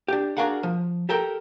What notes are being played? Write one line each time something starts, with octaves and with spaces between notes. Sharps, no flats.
D4 G4
D4 F#4 G#4 A#4 F5 F#5
F3
G4 A4 A#4 G5